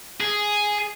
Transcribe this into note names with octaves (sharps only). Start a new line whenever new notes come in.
G#4